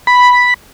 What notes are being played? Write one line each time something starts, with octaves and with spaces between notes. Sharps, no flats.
B5